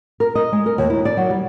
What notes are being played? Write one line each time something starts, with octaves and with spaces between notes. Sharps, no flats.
A#4
D#5
G#3
A#4
D#2
E4
D5
F#3
G3